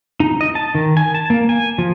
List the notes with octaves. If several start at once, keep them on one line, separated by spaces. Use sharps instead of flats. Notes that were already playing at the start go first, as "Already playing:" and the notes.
D#4
D#5
A5
D#3
G#5
A5
A#3
G#5
F3